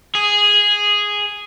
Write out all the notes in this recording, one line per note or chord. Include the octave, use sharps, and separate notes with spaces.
G#4